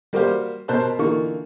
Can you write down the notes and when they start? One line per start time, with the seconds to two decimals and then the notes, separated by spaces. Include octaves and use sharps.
0.13 G3 A#3 F#4 G4 C5 F5
0.68 B2 A#4 C5 A5 F#6
0.99 D3 E3 A#3 D#4 F4 C#6